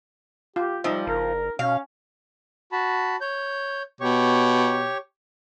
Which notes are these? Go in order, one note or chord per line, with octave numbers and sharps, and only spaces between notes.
F4 G4
F3 G3 D#4 D#5 E5
F#1 A#4
B2 C#4 F5
F#4 A5 B5
C#5 G6
B2 G4 C#5 C#6